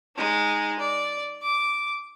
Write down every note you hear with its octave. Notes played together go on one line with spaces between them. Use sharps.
G#3 D#4
D5
D6